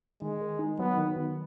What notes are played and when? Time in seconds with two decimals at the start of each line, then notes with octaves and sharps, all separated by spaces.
0.21 D#3 G#3
0.41 D#3
0.59 D#4
0.78 F#3 B3
0.98 D#3
1.16 D#3